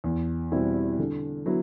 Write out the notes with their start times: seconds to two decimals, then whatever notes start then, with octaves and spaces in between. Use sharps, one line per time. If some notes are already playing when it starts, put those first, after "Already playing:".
0.04 E2
0.51 B2 G3 C4 E4
0.99 D3
1.46 F#3 B3 E4